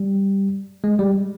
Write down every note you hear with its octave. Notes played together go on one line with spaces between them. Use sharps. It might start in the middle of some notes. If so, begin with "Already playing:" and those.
Already playing: G3
G#3
G3